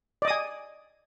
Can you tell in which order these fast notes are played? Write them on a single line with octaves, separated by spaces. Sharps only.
D5 D#5 D#6 G#5